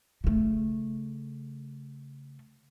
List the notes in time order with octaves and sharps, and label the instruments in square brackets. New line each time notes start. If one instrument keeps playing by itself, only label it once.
[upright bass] C#3 A3